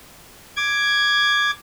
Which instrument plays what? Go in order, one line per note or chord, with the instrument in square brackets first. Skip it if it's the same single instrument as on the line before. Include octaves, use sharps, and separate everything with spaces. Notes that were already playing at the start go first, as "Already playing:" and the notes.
[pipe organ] D6 G#6